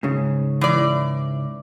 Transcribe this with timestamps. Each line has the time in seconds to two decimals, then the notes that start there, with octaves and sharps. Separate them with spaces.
0.03 G#2 C#3
0.61 E3 D5